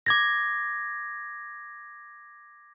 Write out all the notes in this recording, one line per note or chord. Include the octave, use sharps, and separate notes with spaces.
D6 G#6 A#6